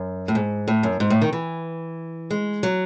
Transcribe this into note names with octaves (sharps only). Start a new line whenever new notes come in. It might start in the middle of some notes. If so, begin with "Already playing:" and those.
Already playing: F#2
A2
G#2
A2
F#2
G#2
A2
D#3
E3
G#3
F#3